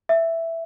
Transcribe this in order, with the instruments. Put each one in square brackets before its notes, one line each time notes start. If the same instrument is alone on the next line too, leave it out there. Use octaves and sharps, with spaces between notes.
[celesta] E5